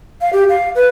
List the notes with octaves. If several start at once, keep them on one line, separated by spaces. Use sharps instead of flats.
F5
G4
F5
B4